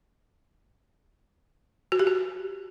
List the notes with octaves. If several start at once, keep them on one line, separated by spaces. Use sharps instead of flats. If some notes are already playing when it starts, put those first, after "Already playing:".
F#4
G4
F#4